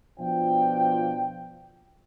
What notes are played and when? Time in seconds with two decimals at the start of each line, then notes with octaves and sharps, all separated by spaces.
0.18 B2 F3 D4 F4 C5 G5